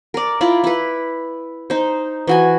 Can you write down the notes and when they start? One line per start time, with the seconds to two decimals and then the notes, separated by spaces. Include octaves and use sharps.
0.14 A#4 D5
0.41 E4 F4 D5
0.64 E4 B4
1.70 D#4 C5
2.27 E3 F#4 G#5